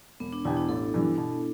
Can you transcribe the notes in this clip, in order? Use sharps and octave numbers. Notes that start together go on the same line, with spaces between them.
E1 B3
D4
E2 B2 B3 E4 G4
D4
A1 A4
G2 E3
B2